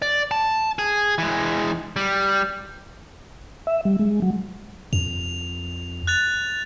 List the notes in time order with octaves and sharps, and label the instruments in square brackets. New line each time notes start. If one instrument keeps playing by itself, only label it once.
[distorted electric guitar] D5
A5
G#4
E3 G#3
G3
[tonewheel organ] E5
G3
G#3
F#3
[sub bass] F2 [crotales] F7
[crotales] F#6 A6 F7